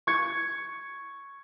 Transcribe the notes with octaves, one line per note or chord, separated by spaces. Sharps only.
C#6 G#6 C#7